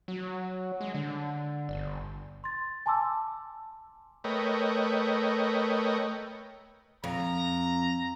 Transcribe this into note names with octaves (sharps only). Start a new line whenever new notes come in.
F#3
G#3
D3
G1
C6 A6
G#5 A5 C6 D6 E6
A3 A#4 B4 C#5 D#5 G5
F2 A#5